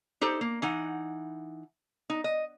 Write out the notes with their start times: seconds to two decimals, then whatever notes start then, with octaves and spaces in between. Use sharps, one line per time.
0.21 D#4 G4 A4 C5
0.41 A#3
0.62 E3 D#4 F#5
2.10 D#4
2.24 D#5